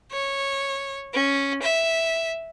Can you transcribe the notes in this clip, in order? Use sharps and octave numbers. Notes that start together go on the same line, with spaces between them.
C#5
C#4
E5